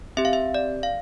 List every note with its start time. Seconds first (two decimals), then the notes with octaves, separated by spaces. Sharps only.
0.17 C4 G4 E5
0.25 F5
0.33 E5
0.54 D5
0.83 F5